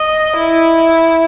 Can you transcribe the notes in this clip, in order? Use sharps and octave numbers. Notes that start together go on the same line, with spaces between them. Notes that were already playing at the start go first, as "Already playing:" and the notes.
Already playing: D#5
E4